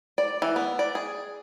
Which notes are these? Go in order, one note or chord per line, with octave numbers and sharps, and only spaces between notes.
D5
E3
B3
D5
G#4